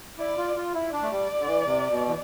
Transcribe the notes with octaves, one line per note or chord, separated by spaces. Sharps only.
E4 D5
F4
F4
E4
D4 D5
A3
G3
D3
E3
C3
B2
E3